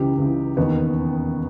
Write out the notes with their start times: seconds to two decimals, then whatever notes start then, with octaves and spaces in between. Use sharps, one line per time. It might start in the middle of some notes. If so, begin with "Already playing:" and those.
Already playing: C#2 C#3 E3 D#4 G4
0.18 C#2 C#3 E3
0.57 E1 D#2 D#3 B3 D#4